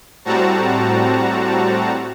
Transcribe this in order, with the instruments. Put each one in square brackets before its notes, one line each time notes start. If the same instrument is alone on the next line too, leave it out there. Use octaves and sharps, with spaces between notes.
[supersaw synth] A2 G3 C4 F#4 A5 A#5